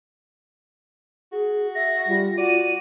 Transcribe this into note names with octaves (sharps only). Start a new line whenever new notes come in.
F#4 G#4
E5 A#6
G3 F4
F#4 D5 D#7